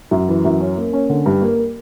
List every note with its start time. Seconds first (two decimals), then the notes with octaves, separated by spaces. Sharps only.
0.11 F#2
0.29 E3
0.45 F#2
0.60 C#4
0.77 A#3
0.93 C#4
1.09 D3
1.26 G2
1.42 A#3